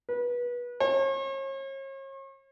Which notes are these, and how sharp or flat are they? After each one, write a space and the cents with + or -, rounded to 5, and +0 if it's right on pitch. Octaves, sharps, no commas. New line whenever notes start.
B4 -25
C#5 -40